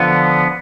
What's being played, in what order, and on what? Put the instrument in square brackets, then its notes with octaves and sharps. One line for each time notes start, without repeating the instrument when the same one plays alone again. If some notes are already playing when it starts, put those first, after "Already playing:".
Already playing: [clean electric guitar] D3 F3 B3